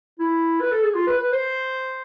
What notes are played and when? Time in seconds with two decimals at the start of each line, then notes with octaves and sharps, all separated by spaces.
0.19 E4
0.60 B4
0.71 A4
0.83 G#4
0.94 F4
1.07 B4
1.19 B4
1.32 C5